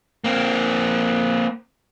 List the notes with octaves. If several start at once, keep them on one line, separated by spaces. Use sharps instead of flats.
A#3 C4